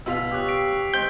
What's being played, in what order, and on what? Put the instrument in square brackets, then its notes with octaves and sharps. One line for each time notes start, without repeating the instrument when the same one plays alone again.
[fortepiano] B2 F4 [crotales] E6 B6 F7
[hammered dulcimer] G4 C#5 [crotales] D#6 F#6
[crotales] B6 C7 D7
[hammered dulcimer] G#2 C4 [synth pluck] G6